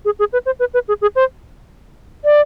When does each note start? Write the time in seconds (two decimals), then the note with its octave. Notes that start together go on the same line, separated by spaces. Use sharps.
0.05 G#4
0.19 G#4
0.33 B4
0.46 C5
0.60 B4
0.74 B4
0.88 G#4
1.02 G#4
1.16 C5
2.25 D5